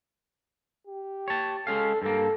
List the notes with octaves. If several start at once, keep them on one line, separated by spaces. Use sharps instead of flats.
G4
C#5 A5
G#3 C#4 A4 F5
G2 A#3 A4